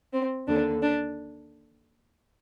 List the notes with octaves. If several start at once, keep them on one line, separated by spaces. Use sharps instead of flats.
C4
D#2 D3 D4
D4